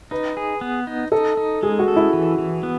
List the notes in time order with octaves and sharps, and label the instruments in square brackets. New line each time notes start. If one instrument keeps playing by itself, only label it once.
[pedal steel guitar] D#4 [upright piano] B4
[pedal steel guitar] G#4
B3
D#4
[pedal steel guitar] D#4 [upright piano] A4
[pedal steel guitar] D#4
[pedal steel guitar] G#3 [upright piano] G#4
[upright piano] F#4
[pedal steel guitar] A4
[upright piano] E4
[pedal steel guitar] E3
E3
B3